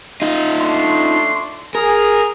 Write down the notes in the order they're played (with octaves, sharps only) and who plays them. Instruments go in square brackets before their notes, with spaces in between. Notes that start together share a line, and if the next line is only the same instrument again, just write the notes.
[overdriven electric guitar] D#4 F4
[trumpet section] A3 D4 C6
[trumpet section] G#4 [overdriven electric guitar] A#4